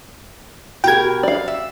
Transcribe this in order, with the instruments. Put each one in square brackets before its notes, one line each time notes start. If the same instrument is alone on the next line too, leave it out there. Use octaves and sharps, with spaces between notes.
[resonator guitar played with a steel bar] B2 A#4 [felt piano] F#4 G4 [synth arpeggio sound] G5 G#6
[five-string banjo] D5 F5
[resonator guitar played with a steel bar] E5